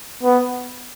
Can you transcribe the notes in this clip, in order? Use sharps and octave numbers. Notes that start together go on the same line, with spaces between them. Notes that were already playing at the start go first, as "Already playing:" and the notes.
B3